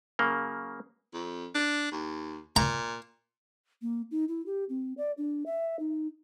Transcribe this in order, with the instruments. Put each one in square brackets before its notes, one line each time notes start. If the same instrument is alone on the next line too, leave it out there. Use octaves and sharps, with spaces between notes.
[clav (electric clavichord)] C#3 F#3 A#3
[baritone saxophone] F2
D4
D#2
[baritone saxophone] A#2 [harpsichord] A#5
[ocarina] A#3
D#4
E4
G4
C4
D5
D4
E5
D#4